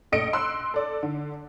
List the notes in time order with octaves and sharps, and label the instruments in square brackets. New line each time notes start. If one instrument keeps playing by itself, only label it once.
[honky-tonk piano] A#1 A3 D#5 C#7 D7
C6 E6 F#6
A4 D5
D3